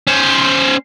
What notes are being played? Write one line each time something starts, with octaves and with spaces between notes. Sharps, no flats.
C#4 C5